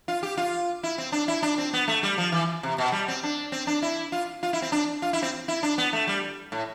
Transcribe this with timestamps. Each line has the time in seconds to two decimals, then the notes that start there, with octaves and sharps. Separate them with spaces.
0.08 F4
0.23 G4
0.37 F4
0.83 E4
0.98 C4
1.12 D4
1.28 E4
1.43 D4
1.58 C4
1.73 B3
1.88 A3
2.03 G3
2.18 F3
2.32 E3
2.63 C3
2.78 B2
2.92 G3
3.08 C4
3.23 D4
3.52 C4
3.67 D4
3.82 E4
4.12 F4
4.43 F4
4.53 E4
4.62 C4
4.72 D4
5.02 F4
5.13 E4
5.22 C4
5.48 E4
5.63 D4
5.78 B3
5.93 A3
6.07 G3
6.52 A2